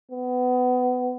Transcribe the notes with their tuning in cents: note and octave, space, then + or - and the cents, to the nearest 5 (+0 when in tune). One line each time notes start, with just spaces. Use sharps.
B3 +25